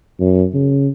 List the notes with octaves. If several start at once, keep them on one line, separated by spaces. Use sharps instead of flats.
F#2
C#3